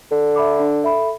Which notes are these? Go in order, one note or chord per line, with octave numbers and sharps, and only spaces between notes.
D3 A4
E5 B5 D6
D4
A4 E5 B5